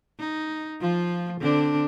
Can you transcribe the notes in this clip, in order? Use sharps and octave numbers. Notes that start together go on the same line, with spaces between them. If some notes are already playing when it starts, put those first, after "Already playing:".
D#4
F3 F4
D3 C4 D4